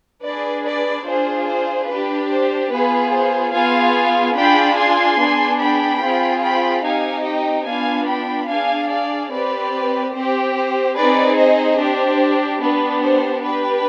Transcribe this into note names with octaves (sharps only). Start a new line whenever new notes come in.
D4 G#4 B4 D5
B4 D5
D4 F4 G#4 C5
C5
D4 G4 B4
C5
B3 F4 G#4 B4
C5
B3 F4 G#4 F5 G#5
D4 F4 G#4 G5 B5
G#5 C6
B3 D4 G#4
G5 B5
C4 F4 G#4
G5 B5
C4 D#4 G4 F5 G#5
D#5 G5
B3 D4 F4 F5 G#5
G5 B5
D4 G#4 F5 G#5
D5 F5
C4 G4 B4 D5
C4 G4 C5
C5
C4 D#4 G#4 B4 D5
C5 D#5
D4 G4 C5
B3 D4 G4 B4
C5
D4 G4 B4